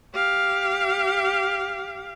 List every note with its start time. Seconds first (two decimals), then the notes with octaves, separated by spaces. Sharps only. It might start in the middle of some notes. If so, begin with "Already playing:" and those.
0.14 G4 F5